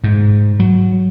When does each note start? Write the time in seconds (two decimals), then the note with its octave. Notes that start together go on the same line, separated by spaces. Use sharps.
0.04 G#2
0.60 F#3